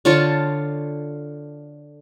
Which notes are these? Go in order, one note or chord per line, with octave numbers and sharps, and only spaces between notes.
D3 F4 C#5 A5